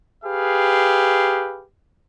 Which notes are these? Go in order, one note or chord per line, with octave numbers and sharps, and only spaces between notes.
G4 G#4 B4 F5